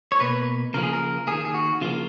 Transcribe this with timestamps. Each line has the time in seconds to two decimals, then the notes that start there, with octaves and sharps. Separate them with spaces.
0.12 C#5
0.20 B2 A#3 B4
0.74 C#3 F3 A#3 A#4
0.83 G#4
0.93 A#4
1.27 D#3 A#3 G#4
1.45 G#4
1.54 F#4
1.81 C#3 F3 A#3 F4